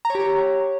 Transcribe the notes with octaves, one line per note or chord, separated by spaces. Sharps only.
A#5
C#5
G4
C#5